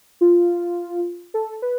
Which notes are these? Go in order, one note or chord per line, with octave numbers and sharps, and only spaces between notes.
F4
A4
B4